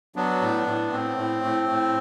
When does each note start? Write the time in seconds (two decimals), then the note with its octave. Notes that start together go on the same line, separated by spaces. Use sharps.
0.16 F#3 B3 D4
0.41 A2
0.67 A2
0.92 A2 C4
1.18 A2
1.43 A2
1.69 A2